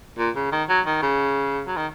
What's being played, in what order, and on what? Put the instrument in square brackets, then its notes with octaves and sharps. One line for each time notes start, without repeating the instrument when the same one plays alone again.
[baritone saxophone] A#2
C#3
D#3
F#3
D#3
C#3
F#3
D#3